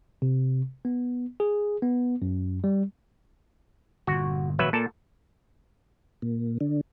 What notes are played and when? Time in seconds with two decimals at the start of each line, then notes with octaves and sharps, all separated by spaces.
0.22 C3
0.85 B3
1.40 G#4
1.82 B3
2.22 F#2
2.64 G3
4.07 G1 A#2 F#4
4.59 G#1 A#2 C#3 F#3 B4 E5
4.73 A#2 A#3 A4 A5
6.22 A#2
6.61 D3